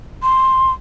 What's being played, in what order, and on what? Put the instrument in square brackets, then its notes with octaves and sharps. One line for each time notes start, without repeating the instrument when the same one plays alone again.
[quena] C6